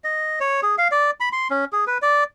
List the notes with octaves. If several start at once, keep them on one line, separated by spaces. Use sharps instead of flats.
D#5
C#5
G#4
F5
D5
B5
C6
C#4
G#4
B4
D5